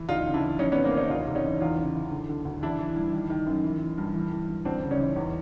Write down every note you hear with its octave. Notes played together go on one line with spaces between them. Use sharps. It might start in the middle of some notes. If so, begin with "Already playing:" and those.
Already playing: E3
D2 D#4 F4
C#3
D4 E4
E3
F2 C#4 D#4
B3 C#4
C3
A#3 C4
D#3 C#4 D#4
D2 D#4 F4
C3
C#4 D#4
E3
E2 D#4 F4
C#3
E3
D3
D3
D2
E3 D4 E4
E3
G2
D#3
D#3
F#2
E3
E3
G2
E3
E3
G2
D2 C4 D4
C#3
C#4 D#4
E3
E2